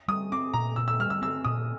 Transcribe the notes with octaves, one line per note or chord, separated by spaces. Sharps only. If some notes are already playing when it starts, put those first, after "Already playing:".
G3 D#6
C4 D6
A#2 A#5
A#2 E6
E6
G3 F6
E6
C4 E6
A#2 D#6